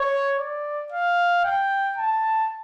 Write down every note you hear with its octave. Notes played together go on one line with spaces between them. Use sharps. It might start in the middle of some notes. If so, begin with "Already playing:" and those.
Already playing: C#5
D5
F5
G5
A5